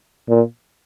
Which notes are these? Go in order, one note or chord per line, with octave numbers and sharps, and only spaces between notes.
A#2